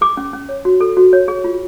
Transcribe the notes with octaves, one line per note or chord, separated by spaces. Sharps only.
G#4 D6
C#4
C#4
C#5
F#4
A4
F#4
C#5
G#4
F4